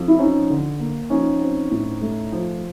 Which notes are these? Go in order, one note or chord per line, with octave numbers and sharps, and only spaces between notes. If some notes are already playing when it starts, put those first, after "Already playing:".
Already playing: F2
E4
F3 C#4 D#4
D3
A#3
F3 C#4 D#4
C4
A2
A3
F3